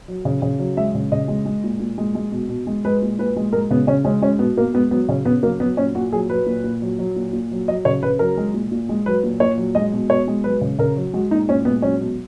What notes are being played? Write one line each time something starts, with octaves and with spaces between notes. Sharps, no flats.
F#3
C#3
C#3
F#3
G#3 E5
C#3
C#3 D#5
G#3
G#3
A#2
A#2
G#3
G#3
B2
B2
G#3
G#3 B4
A#2
A#2 B4
G#3
G#3 A#4
C#3 B3
C#3 C#4
G#3 C#4
G#3 C#4
B2 B3
B2 A#3
G#3 B3
F#3 B3
C#3 C#4
C#3 B3
F#3 A#3
F#3 B3
A#2 C#4
A#2 F#4
F#3 G#4
F#3 B4
A#2
A#2
F#3
F#3
A#2
A#2
F#3
F#3 D#5
C#3 C#5
C#3 B4
F#3 A#4
G#3
A#2
A#2
G#3
F#3 B4
A#2
A#2 C#5
F#3
G#3 D#5
B2
B2 C#5
G#3
F#3 B4
C#3
C#3 A#4
F#3
G#3 F#4
A#2 D#4
A#2 C#4
G#3 B3
F#3 C#4
B2